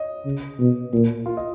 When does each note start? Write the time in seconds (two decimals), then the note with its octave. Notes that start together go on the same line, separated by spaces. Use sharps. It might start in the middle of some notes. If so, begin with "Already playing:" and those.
Already playing: C#5 D#5
0.25 C#3
0.59 B2
0.93 A#2
1.26 F4
1.37 D#5